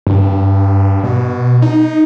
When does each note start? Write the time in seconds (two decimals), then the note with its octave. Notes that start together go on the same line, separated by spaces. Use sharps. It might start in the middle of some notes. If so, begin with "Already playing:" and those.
0.07 G2
1.03 B2
1.62 D#4